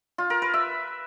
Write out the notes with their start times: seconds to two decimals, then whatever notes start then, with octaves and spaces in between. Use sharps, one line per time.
0.18 F4
0.30 A#4
0.42 B4
0.54 E5